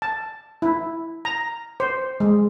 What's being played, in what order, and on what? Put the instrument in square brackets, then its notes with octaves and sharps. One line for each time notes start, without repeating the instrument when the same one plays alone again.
[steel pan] A5
E4
A#5
C5
G#3